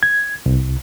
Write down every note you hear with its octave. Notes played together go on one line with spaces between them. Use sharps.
G#6
C2